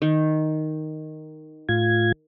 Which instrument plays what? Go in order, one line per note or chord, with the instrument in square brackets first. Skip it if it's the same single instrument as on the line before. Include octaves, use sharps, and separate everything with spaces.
[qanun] D#3
[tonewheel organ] A2 F4 G#6